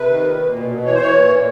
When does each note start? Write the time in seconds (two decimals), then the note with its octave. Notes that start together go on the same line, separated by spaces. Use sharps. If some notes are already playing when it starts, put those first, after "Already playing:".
Already playing: C3 B4
0.10 D#3
0.25 A#2
0.40 A#2
0.54 B2
0.70 B2
0.85 E3 C#5
0.93 C5
1.00 E3 C#5
1.15 A#2
1.30 A#2